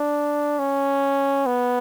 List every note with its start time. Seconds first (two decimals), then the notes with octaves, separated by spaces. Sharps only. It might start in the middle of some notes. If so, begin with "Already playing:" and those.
Already playing: D4
0.59 C#4
1.47 B3